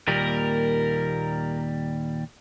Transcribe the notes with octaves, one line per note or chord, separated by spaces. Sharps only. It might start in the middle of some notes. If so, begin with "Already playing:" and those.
D#2 A#2 G3 A#4